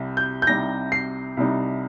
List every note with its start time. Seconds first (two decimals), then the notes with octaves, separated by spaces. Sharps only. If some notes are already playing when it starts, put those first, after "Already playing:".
Already playing: C2 C3 G3
0.17 G6
0.42 G6
0.47 C2 C3 G3 D#4 A#6
0.92 C7
1.37 C2 C3 G3 D#4